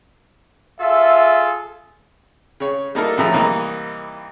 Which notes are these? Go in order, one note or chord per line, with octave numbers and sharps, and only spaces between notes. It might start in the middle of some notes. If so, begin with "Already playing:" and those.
F4 G#4 A4 E5
C#3 C#5
G3 A#3 D#4 E4 A4 A#4
D2 A2 C#3 F3 E5 A#5
C2 E3 A#3 D#4 A#5